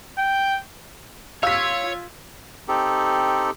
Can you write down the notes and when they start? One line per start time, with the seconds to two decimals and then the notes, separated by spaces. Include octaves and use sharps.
0.18 G5
1.43 F4 C#5 F5 E6 G#6 B6
2.68 C4 D#4 G4 A4